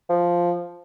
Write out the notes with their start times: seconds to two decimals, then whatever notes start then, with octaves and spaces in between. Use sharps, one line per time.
0.10 F3